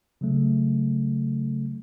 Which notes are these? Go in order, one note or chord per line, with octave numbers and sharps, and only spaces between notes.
C#3 F#3 A3